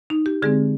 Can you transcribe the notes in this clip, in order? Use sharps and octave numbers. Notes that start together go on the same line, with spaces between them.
D#4
G4
D3 G#3 C4 G#4